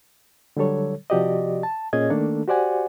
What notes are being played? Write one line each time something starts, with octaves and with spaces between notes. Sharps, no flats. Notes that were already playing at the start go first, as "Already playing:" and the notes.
D3 F#3 G3 A4 C#5
C3 F3 F#4 G4 D5 D#5
A5
A#2 C#4 G#4 C#5 D#5 G#6
D#3 A3 A#3 D4 A4
F#4 G4 C5 D5 F#5 G#5